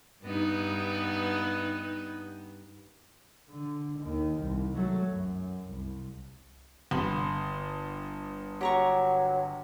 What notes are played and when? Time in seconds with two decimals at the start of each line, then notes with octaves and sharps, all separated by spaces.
0.24 G2 B3 D#4
3.50 D3
3.99 D#2 D#3
4.41 C2
4.76 F#3 A3
5.09 F#2
5.69 C2
6.91 G1 B5 C6
8.61 F#3 G4 A#5 C#6